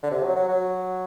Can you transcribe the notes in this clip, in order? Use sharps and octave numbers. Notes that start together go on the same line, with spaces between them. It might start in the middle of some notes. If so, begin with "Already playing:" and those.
D3
C3
F#3
F#3
F#3